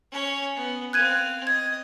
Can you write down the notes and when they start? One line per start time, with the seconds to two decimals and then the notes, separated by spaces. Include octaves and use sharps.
0.12 C#4 C#5
0.56 B3
0.93 C4 F5 F#6 G#6 D#7
1.47 D#5 G#6